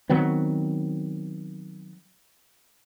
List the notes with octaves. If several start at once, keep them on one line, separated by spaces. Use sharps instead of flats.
D#3 F#3 B3 C4